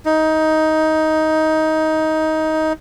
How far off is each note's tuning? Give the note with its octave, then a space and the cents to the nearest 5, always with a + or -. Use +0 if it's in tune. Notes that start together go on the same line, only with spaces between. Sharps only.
D#4 +15